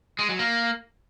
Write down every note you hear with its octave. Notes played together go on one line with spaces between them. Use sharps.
G#3
F#3
A#3